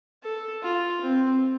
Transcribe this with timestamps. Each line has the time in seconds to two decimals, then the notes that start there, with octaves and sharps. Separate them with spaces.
0.23 A4
0.63 F4
1.02 C4